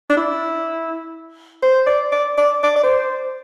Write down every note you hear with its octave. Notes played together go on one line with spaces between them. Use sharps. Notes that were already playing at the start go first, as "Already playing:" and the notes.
D4
E4
C5
D5
D5
D5
D5
D5
C5